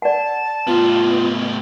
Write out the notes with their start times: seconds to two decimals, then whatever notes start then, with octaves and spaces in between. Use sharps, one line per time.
0.02 D5 F#5 A5
0.67 A2 B3 F4